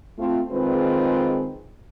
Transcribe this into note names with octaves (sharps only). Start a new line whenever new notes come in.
A3 C4 F4
D#3 G#3 C4 F4 G#4 B4